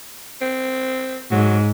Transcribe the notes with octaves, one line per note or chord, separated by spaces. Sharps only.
C4
G#2 F#3